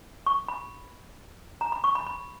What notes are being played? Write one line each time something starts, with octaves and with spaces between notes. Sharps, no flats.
C#6
B5
A#5
B5
C#6
B5
B5